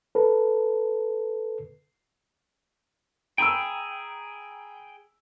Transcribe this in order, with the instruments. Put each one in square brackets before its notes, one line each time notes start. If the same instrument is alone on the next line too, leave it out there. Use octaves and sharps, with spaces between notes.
[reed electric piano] A4 B4
[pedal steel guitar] G#4 G5 [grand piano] A#5 B5 E6